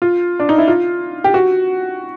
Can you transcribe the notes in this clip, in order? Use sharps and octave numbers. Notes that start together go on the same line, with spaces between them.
F4
D4
D#4
E4
F4
G4
F#4